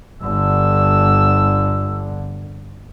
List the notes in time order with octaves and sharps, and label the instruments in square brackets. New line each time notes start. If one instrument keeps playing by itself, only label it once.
[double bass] G1 D3 [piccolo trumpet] E6